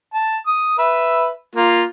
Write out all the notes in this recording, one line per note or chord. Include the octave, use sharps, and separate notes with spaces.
A5
D#6
B4 E5
A#3 F4